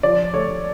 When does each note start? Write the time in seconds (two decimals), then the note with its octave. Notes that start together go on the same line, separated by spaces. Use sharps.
0.03 F3 D5
0.34 A3 C#5